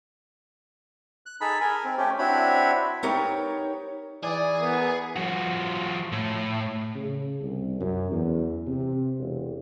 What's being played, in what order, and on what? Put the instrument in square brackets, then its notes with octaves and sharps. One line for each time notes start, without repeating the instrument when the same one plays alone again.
[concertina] F#6
D#4 G#4 A4 B5
A#4 G#5
C4
A3 C#4 G4
C4 D4 E4 F#4 C#5 B5
[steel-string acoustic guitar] B3 D#4 G4 A#4 C#5 A#5
[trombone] E3 [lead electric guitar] G#4 [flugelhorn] D5
[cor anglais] B3 [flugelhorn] A#4
[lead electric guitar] F3 F#4
A2
[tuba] C#3
C2
F#2
E2
C3
E1